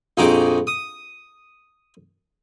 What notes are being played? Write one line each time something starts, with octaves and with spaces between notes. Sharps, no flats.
A#1 F2 D#4 F#4 G#4 D6
D#6